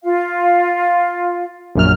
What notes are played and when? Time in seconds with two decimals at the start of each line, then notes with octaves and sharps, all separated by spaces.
0.03 F4 F5
1.75 A#1 F#2 F6